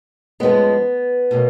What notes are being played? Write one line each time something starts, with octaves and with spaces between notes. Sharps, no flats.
F#2 F3 G#3 B3
B2 F#3 A#3